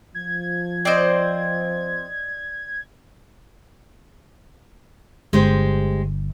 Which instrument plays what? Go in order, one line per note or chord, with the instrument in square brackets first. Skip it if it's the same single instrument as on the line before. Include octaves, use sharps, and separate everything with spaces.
[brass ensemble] F3 [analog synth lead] G#6
[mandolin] C4 C5 [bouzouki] D5 D#5
[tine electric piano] G1 [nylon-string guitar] G#3 G4 C5